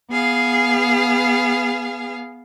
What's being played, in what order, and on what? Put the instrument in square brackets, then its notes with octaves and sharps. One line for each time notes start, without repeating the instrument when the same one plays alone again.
[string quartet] B3 G#4 F5